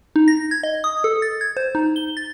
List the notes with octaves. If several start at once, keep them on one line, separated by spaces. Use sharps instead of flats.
D#4
A#6
G#6
D#5
D#6
A4
A6
G#6
C5
D#4
G7
A6